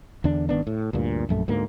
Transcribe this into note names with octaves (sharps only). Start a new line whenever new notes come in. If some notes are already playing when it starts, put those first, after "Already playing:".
E2 D3 D4
G#1 D#3 B3 D4
A2
D2 G2 A#2
A#1 F#2 A3
D2 G#2 A#3